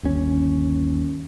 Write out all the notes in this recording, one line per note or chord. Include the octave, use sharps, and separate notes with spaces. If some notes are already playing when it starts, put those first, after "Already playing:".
G1 D#2 C#4